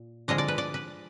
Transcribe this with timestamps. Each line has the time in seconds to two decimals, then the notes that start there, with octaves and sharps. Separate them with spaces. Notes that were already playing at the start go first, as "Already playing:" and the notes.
Already playing: A#2
0.28 D3 F3 G#3 D#5
0.38 D5
0.48 B4
0.58 D5
0.74 B4